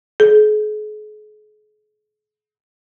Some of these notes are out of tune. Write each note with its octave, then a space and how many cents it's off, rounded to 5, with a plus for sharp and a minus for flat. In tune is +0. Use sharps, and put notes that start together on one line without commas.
G#4 +40